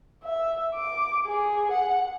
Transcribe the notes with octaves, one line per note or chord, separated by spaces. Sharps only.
E5
D6
G#4
F#5